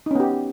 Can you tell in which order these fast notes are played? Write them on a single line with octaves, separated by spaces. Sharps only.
D#4 C#4 B3 G4